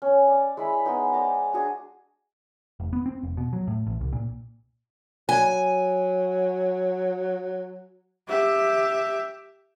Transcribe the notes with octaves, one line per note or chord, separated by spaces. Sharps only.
C#4
D5
G#3 E4 B5
G#3 B3 D#4
C5 D5 A#5 D6
D4 F#4 G#4
F1
B3
C4
F1
B2
F#3
A2
A1
C2
A#2
F#3 G#5
G4 E5